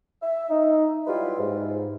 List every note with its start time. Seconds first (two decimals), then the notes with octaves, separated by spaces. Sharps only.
0.22 E5
0.50 D#4
1.07 F#3 G3 E4 F4 G4 B4
1.39 G#2